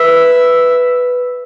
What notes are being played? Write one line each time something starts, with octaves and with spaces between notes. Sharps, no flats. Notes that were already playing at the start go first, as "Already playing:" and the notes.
Already playing: B4 E5